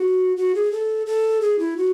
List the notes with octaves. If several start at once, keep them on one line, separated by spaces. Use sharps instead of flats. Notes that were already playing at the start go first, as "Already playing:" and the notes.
Already playing: F#4
F#4
G#4
A4
A4
G#4
E4
F#4